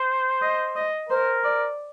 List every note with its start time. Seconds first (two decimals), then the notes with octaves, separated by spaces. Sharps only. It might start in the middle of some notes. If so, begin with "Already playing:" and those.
Already playing: C5
0.42 D#5
0.76 D#5
1.09 A#4 C5
1.44 D5